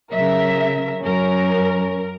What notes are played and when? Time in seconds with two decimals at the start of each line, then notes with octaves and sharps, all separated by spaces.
0.13 C#3 F#3 A#4 E5
1.04 F#2 C#4 A#4